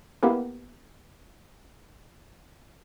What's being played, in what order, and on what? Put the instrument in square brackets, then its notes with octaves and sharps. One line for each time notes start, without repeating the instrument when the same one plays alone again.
[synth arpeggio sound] A#3 B3 E4 G4 A#4 B4